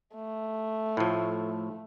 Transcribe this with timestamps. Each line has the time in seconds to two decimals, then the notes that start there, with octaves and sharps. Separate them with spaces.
0.15 A3
0.97 A2 F3